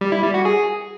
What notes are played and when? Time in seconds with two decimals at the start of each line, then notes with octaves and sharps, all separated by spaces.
0.01 G3
0.12 E4
0.23 G3
0.34 F#4
0.45 G#4